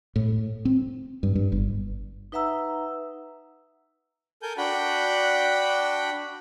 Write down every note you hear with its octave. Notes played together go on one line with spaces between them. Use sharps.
A2
C4
G2
G2
G1
D#4 B4 E5 F#5 A#5 E6
A4 A#4 G#5 G6
D4 F#4 F#5 G5 B5